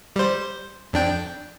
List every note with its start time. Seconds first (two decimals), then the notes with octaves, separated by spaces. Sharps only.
0.16 G3 C5
0.93 F2 D4 G5